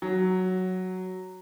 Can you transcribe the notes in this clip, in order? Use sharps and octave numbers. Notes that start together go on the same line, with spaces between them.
F#3